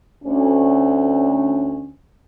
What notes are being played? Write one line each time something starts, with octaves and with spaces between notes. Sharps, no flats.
D2 C#4